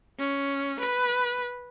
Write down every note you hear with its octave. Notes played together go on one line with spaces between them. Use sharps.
C#4
B4